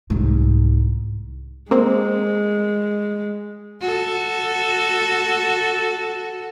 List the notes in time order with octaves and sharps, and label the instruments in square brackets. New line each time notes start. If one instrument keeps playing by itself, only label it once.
[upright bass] C2 G#2
[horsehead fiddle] G#3 [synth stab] A#3 C4
[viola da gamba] F#4 A4